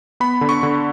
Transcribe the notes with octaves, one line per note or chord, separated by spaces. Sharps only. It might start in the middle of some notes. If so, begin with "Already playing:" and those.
B3 B5
D3
C#6
D3